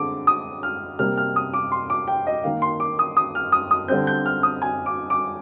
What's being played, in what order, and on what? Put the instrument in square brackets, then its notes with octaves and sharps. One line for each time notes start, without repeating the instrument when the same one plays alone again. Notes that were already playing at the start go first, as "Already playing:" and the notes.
Already playing: [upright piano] D3 G#3 C4 D6
D#6
F6
C3 G3 A#3 F6
F6
D#6
D6
C6
D6
G5
D#5
D#3 A#3 F5
C6
D6
D#6
D#6
F6
D#6
D#6
D3 G3 C4 G6
G6
F6
D#6
G#5
D6
D6